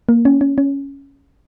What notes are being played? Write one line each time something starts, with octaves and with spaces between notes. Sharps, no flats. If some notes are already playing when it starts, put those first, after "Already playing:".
A#3
C#4
C#4
C#4